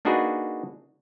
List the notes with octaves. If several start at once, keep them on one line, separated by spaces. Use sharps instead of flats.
A#3 D4 D#4 F#4 G#4 B4